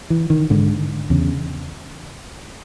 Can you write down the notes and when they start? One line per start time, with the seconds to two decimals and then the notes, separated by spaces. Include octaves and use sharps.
0.10 E3
0.30 D#3
0.50 G#2 D3
1.10 E2 C#3